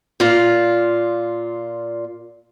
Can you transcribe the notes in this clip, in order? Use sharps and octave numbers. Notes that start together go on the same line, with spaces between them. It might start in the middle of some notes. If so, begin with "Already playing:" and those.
A#2 F4